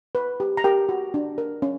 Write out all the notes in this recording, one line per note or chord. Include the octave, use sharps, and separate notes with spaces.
B4
G4
A#5
G4 A#4 G5
F#4
D4
A#4
C#4